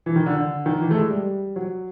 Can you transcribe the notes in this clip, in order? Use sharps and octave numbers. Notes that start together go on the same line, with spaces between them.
E3
D#3
D3
D3
D#3
E3
A3
G#3
G3
F#3